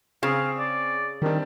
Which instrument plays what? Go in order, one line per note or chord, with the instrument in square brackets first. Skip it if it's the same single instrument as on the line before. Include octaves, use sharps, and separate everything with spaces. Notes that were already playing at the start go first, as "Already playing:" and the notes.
[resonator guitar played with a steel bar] C#3 [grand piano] C4 G#4 [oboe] F5
[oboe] D5
[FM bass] D#3 [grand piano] G3 C4 D4